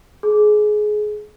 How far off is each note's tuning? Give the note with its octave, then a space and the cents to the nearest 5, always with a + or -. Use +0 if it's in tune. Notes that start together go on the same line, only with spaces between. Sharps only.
G#4 +20